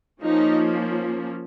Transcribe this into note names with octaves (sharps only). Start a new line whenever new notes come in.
F3 A#3 C#4 D#4